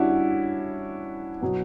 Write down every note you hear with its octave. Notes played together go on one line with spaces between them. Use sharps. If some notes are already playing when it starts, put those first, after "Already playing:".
Already playing: G3 C#4 D4 E4 F#4
B2 F#3 B3